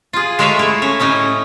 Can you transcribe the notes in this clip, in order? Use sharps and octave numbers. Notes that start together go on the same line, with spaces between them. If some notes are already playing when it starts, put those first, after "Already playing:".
F4 G#4
G#3 A3 A#4 C#5 E5 F5
A3 E4
C#4
A2 C#4 D#4 E4